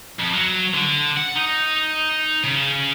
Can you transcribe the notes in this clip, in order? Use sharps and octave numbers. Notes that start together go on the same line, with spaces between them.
F2
F#3
D3
F#5
D#4
C#3